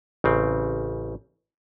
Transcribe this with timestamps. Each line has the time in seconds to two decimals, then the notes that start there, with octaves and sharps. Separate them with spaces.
0.24 A1 C#3 C4